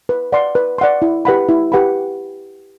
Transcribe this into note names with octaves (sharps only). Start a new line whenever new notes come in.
B4
D5 F#5 C6
B4
D5 F#5 C6
E4
G4 B4 F#5 B5
E4
G4 B4 F#5 B5